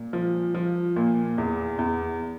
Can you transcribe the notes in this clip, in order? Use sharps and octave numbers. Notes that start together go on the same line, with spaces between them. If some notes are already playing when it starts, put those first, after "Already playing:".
Already playing: A#2
F3
F3
A#2
E2
E2